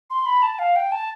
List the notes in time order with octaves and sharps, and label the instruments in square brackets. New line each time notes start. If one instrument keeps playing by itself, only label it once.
[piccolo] C6
B5
A5
F5
G5
A5